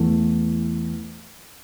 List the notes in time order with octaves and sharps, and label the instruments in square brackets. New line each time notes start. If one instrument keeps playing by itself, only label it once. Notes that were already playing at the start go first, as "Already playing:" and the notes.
Already playing: [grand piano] E2 E3 A3